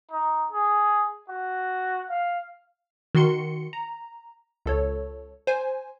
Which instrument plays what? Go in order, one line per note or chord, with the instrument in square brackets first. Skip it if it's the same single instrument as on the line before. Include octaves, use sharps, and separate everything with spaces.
[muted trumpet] D#4
G#4
F#4
F5
[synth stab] D#3 F#4 C6 C#7
A#5
C#2 A4 C#5
C5 G#5